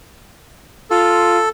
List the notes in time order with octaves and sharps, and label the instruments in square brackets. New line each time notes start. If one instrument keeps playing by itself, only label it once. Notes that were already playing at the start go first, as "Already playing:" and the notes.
[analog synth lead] F4 [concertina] A4